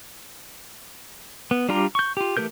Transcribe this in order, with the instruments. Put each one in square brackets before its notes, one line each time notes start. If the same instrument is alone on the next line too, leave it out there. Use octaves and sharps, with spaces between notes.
[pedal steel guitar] B3
G3 D4 F4 G4 A#5
C#6 G6
F4 G4
E3 A3 G4 A#4 G6